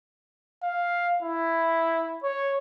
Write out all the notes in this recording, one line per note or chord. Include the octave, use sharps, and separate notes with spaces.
F5
E4
C#5